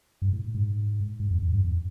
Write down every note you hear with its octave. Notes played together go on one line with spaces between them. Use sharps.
G2
A2
G#2
G#2
F2
E2
G2
F2